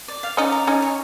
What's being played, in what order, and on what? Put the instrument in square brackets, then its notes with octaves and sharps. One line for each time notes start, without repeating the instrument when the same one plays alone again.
[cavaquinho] D5
F5
[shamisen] C#4 D#4 [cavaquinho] D5
[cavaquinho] A#5
[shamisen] C#4 D#4 [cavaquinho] G#5
[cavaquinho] C#5